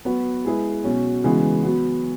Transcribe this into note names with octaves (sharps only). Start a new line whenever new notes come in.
F#3 B3 F#4 B4
G#3 E4 G#4 B4
B2 F#3 C#4
C#3 E3 G#3 B3 F#4
F#3 B3 F#4